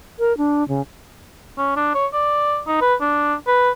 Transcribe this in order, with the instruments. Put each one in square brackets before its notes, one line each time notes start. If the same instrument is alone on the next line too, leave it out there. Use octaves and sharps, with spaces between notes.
[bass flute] A#4
D4
C#3
[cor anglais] C#4
D4
C#5
D5
D#4
B4
D4
B4